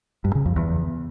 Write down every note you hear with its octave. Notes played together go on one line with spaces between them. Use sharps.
G2
C#3
F2
E2